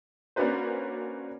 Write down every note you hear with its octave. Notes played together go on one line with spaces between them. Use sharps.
A#3 C#4 D4 F#4 B4 C5